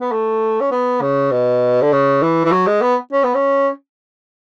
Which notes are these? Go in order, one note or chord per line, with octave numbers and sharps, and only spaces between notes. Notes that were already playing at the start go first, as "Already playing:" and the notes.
B3
A3
C#4
B3
C#3
B2
D3
C#3
E3
E3
F#3
G#3
B3
C#4
B3
C#4